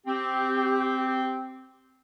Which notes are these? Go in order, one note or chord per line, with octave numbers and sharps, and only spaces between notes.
C4 G4